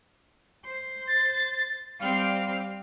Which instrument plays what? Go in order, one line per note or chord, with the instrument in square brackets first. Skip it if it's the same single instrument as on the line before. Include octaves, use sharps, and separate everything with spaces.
[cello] C5
[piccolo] A6
[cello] G3 C4 [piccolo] F5